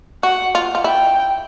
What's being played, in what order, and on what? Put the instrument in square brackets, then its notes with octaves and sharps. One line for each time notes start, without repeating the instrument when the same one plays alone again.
[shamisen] F#4 [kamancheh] F#5
[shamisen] F4
F4
[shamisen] E4 [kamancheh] G5